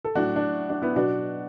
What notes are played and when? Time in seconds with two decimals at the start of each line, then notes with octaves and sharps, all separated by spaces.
0.05 A4
0.15 A2 F#3 D4 F#4
0.36 D4
0.70 D4
0.82 B3 E4
0.96 B2 F#3 D4 F#4